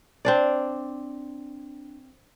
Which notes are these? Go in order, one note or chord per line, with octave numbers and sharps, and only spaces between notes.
C4 D4 D5